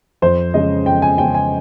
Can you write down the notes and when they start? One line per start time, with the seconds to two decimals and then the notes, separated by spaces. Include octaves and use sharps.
0.22 F2 C5
0.54 C#3 G#3 C#4 D#5
0.86 F2 G5
1.02 G#5
1.18 C#3 G#3 C#4 G5
1.35 G#5